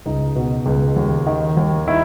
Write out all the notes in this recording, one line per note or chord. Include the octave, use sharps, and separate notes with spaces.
C#2 D#4
B2
C#2
D#2
D#3
D#2
D#3 E4